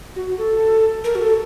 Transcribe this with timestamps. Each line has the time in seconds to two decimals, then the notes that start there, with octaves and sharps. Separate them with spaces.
0.16 F#4
0.38 A4
1.04 A#4
1.15 F#4
1.21 A4